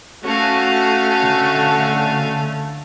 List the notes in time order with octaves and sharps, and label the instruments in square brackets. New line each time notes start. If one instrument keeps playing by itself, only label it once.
[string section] A3 [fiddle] C#4 F5 [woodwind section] F#4
[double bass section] D3